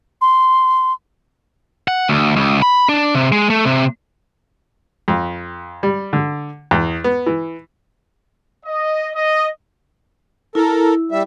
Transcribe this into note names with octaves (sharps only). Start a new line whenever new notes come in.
C6
F#5
D2
C#2
B5
D4
C3
G#3
A3
C3
F2
G3
D3
E2
B3
E3
D#5
D#5
E4 A4 A#4
G3 E5